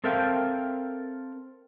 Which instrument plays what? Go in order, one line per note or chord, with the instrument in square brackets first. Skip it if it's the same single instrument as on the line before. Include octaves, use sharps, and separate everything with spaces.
[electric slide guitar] C4 A4 A#4 E5 F5 G5